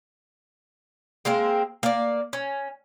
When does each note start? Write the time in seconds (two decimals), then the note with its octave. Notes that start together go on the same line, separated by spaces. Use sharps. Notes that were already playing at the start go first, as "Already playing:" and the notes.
1.25 G#3 A#3 C4 A#4
1.83 A#3 D5
2.33 C#4